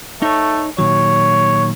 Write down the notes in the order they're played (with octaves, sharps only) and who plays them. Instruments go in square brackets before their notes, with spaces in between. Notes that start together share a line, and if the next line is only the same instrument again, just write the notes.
[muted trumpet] A3 [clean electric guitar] D#4 C#5
[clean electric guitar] A#2 D#3 F#3 [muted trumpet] C#5